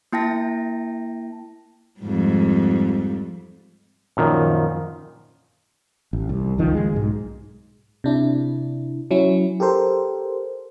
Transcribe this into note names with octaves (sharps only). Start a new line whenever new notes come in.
A#3 E4 G5 A5 A#6
F2 G#2 G3
F#2 A#2 D#3 F3
A1
C2
F#1 C#2 D#3 F3
G#3
B1 G#2
C3 D4 E4
F#3 C#4 E4
G4 A4 A#4 C5